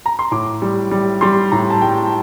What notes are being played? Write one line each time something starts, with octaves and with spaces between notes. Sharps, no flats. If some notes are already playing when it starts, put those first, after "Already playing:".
A#5
C6
A2 D6
G3
G3
G3 C6
A2 A#5
A5
G3 G5